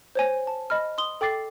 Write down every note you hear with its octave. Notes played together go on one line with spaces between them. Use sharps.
C5 C#5 G#5
A5
D#5 B5 F6
C6 D#6 G7
A4 G5 D6 A6 C7